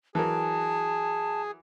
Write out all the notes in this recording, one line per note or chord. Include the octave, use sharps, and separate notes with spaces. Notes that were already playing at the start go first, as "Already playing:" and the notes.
E3 F#3 G#4 A#4 A5